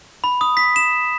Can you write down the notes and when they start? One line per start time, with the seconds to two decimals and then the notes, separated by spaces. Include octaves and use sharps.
0.24 B5
0.41 D#6
0.57 B6
0.76 E7